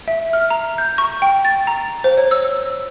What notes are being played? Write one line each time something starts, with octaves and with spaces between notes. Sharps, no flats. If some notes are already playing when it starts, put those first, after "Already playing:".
E5
F6
A#5
G6
C#6
G5
A6
A#5
C5
C#5
E6